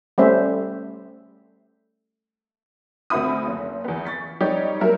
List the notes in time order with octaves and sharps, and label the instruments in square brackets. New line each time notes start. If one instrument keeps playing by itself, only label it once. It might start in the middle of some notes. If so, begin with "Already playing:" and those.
[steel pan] G3 A3 C#4 C5 E5
[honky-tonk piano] D2 C4 F#4 E5 B5 D#6
F#1
E2 B3
C#6 A6 B6
G3 D#4 G4 C#5 D5
F#3 G3 A#3 A#4 E5